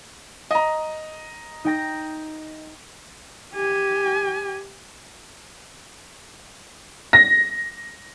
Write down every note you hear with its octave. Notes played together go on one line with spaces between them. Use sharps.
D#5 A#5
D#4 G5 A#6
G4 G#5
A#6